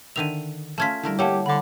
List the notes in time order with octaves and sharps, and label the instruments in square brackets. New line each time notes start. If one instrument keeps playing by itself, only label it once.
[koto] D3 D#3 E5 [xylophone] D#7 F7
[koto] A3 C#4 F4 [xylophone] A5 G#6 B6
[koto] D3 A3 A#4 [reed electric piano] G3 E4
[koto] A3 A#3 [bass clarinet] G4 [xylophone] C#5 F#5 A5
[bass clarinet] D3 [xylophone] B5 D6